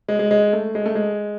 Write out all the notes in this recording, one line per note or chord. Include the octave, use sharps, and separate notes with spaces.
G#3
G#3
G#3
A3
G#3
A3
G#3